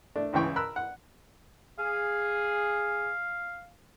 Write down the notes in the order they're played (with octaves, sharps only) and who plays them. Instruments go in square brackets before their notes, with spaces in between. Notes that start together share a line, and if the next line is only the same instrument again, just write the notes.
[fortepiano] A3 D4
C#2 C#3 E3 G5 C#6
A#4 B5 E6 F#6
F#5
[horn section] G#4 [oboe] F5